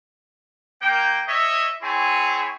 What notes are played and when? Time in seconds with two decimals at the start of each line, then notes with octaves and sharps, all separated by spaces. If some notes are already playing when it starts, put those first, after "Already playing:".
0.82 A#3 G5
1.28 C#5 D#5 E5
1.82 C4 E4 G#4 C#5 G#5